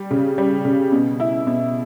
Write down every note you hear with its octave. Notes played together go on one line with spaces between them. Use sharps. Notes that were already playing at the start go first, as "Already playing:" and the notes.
Already playing: G3
C#3
G3
C#3
B2
E4
B2